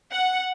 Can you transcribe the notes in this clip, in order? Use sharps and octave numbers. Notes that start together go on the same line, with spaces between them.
F#5